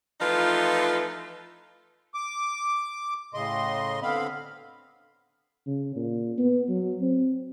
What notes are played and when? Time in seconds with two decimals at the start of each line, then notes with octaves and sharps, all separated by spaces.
0.20 E3 F3 A3 D#4 F4 B4
2.14 D6
3.34 A2 C#3 D#5 C6
4.02 D3 B3 C4 F5 B5
5.67 C#3
5.96 A#2
6.38 B3
6.69 F#3
7.01 C4